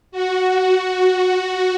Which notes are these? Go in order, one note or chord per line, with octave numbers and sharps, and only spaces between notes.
F#4
F#4